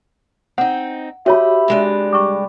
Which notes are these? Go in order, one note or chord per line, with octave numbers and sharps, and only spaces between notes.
C4 D#4 F#5
F#4 G4 C#5 D#5 E5 B5
C3 G#3 D4
G3 C#6 D6